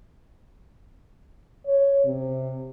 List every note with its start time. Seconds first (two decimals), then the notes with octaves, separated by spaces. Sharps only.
1.66 C#5
2.05 C3